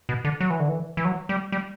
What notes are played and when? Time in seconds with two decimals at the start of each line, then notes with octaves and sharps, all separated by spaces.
0.09 B2
0.25 D3
0.40 F#3
0.50 E3
0.60 D3
0.69 E3
0.97 E3
1.05 F#3
1.29 G3
1.52 G3